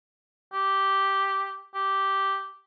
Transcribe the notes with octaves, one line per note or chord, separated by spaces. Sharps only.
G4
G4